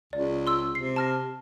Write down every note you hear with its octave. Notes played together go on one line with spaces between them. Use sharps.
C#2 D5
C6 E6
C3 C7
A5 F6 A#6